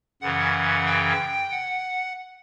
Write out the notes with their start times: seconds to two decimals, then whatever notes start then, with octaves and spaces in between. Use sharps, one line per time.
0.21 F#2 C#3 E3 F#5
0.86 G5
1.52 F#5